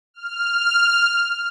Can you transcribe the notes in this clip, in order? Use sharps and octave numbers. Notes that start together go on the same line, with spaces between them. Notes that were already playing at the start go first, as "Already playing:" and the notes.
F6